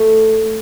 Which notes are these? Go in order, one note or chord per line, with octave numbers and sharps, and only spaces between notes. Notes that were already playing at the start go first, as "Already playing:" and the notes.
Already playing: A3